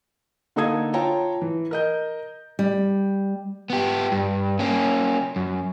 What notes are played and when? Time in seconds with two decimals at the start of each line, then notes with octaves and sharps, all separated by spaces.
0.56 D3 A#3 D#4 A4 D#6 G#6
0.94 F4 C#5 G5 A5 A#5
1.42 E3
1.71 A#4 D#5 G6
2.59 G3
3.70 B3 G4
4.12 G2
4.59 A#3 C#4
5.36 F#2